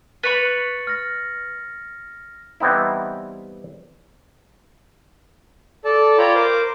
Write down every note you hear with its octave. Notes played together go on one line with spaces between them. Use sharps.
B4 C#5 B5 A6 C#7 F#7
F6 A#6
E3 G3 B3 C4 D#4 E4
A4 D5 A5
F4 C#5 D5 G5 A#5 B5
A#4 C5 D6